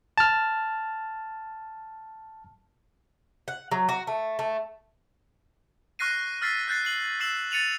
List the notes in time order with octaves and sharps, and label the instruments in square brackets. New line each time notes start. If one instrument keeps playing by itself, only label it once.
[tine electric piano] A5 F6
[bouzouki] F#5
F#3
F#4
A3
A3
[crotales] C#6 F6 F#6 A#6 C7 D#7
E6 F6 A6 B6 C7
F#6 G6 A6 C7
C7 F#7
E6 C7 E7 F#7
A6 C#7 D#7 F7 F#7